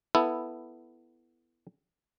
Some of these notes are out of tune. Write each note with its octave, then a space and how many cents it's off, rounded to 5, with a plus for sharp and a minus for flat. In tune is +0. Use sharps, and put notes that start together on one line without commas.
B3 +0 E4 +5 A4 +0